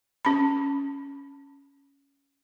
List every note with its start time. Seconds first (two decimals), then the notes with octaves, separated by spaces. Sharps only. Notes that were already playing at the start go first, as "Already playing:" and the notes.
0.25 C#4 B5